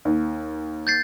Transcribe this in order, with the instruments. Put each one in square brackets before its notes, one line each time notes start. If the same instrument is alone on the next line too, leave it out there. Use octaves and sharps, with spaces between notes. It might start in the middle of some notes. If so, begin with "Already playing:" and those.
[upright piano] D#2
[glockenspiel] G6 A6 C7